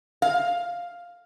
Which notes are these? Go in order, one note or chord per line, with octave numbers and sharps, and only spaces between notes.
F5